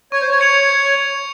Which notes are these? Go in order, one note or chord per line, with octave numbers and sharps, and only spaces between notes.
C#5 C#6
C5
C#5
G#6 C#7 F7